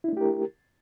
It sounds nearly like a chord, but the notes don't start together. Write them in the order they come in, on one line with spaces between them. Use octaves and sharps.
E4 D4 A3 G4 A#4